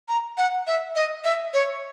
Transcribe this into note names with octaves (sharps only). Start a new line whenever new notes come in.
A#5
F#5
E5
D#5
E5
C#5